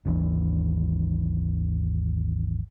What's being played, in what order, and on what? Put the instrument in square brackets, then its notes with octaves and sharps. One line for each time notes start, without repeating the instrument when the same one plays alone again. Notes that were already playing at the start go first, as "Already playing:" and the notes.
[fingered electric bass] G#1 D#2 E3 D4